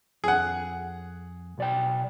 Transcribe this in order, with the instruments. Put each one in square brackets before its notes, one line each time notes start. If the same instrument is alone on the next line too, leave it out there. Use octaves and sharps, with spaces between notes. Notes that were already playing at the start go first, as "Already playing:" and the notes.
[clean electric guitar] F2 [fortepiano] G#4 F#5
[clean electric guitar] B1 D5 G5